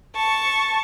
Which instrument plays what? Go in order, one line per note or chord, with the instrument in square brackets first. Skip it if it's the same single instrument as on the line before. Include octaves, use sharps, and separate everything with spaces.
[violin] A5 C#6